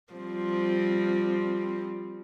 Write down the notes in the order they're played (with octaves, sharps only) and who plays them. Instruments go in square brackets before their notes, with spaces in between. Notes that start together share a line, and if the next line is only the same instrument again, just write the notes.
[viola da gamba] F3 G3 C4